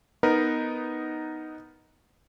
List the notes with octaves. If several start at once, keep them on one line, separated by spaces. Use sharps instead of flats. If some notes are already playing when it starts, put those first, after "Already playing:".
B3 D#4 A#4 B4